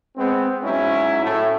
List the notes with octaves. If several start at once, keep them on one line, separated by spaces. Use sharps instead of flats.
G#3 B3 C4
G#2 F#3 C#4 E4
A2 A3